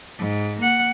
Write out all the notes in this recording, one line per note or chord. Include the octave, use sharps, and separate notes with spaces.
G#2
A#3 F#5